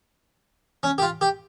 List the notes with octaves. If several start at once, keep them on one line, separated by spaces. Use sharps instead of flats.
C#4
G4
F4
G4